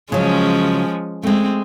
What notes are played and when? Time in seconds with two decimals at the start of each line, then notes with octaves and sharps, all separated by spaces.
0.12 C#3 F3 F#3 G#3 C#4
1.23 G#3 A3 C4